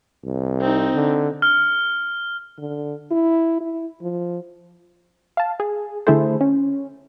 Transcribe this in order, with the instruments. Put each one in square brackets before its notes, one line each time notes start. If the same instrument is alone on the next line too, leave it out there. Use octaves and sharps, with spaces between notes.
[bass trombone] C2
[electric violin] C4 D#4
[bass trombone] D3
[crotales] F6
[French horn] D3
E4
E4
F3
[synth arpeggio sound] F5 A5
G#4
D3 A3 E4 G#4 A4 C5
C#4